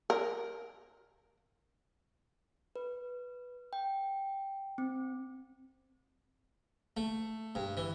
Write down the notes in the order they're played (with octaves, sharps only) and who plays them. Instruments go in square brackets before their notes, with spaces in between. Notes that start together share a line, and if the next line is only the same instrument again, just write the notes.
[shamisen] A#4
[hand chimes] B4
G5
C4
[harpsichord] A3
G2
E3